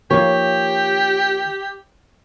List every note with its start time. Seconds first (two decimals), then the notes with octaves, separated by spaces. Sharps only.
0.11 D#3 F3 A#3 G4 C#5